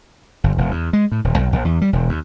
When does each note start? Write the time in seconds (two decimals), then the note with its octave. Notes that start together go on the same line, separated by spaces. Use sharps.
0.44 G1
0.58 E1
0.71 E2
0.93 G#3
1.12 A2
1.24 D#1
1.39 B1
1.52 A#1
1.65 E2
1.81 G3
1.93 E1
2.09 D#2